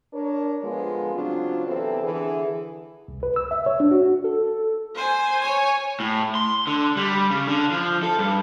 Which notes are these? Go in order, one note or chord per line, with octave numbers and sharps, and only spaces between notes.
D4 A#4 C#5
D3 F3 G#3 B3 F4
C#3 F#3 C4 D4 F4
C3 E3 B3 C4 E4 A4
D3 E3 G#4
C2
B4
E6
E5
C#5
D4
F#4
A4
C5 G#5
C#5 G#5
A2
C6
D3
G3
C#3
D3
F3
A4
G2